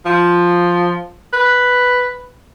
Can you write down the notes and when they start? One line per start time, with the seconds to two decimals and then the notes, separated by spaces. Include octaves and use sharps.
0.06 F3
1.33 B4